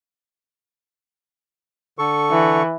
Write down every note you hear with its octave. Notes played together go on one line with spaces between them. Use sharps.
D3 A4 C#6
E3